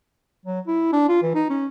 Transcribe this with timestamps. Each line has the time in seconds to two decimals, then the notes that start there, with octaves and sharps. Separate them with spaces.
0.46 F#3
0.67 E4
0.93 D4
1.08 F4
1.23 E3
1.35 D#4
1.50 C#4